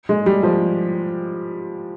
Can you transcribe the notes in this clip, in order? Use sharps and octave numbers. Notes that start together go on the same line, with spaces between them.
G#3
G3
F3